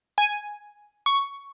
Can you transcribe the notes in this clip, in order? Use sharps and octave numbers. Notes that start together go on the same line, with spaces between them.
G#5
C#6